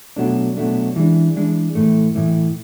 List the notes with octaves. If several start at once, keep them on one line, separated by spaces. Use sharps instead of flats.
B2 F#3 A3 D4
B2 F#3 A3 D4
E3 G#3 D4
E3 G#3 D4
A2 E3 A3
A2 E3 A3